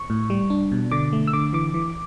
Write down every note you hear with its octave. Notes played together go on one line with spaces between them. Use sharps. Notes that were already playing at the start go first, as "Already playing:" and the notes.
Already playing: C#6
A2
G3
D4
B2
D3 D6
A3
E6
D3 D6
E3 D6
E3